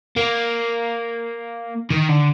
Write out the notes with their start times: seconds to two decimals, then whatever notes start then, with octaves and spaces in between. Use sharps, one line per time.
0.17 A#3
1.90 D#3
2.08 D3